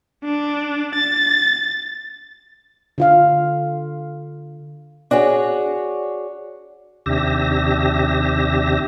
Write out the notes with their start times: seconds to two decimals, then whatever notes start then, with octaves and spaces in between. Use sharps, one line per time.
0.24 D4
0.95 A6
2.98 D3 F4 F5
5.11 D4 F#4 G#4 C#5 F#5
7.06 D#2 C3 D4 G4 E5 A#6